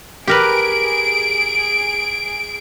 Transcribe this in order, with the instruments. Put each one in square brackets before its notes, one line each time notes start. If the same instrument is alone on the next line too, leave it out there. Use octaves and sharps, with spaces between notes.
[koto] G4 A#4 B4 [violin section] G#4 D7